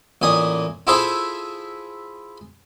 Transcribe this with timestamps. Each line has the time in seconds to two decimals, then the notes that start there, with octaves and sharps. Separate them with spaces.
0.22 A1 A#2 G#5 D#6
0.87 E4 F4 G#4 A4 C5 E5